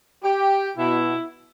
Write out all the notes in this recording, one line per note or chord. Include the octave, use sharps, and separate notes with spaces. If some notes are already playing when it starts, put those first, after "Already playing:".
G4
B2 E4